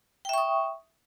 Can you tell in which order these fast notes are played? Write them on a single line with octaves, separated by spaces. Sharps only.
G5 E5 C#6 D#6